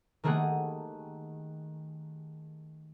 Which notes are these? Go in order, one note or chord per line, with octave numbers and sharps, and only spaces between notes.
D#3 A3 A#3 G4 G#4 F#5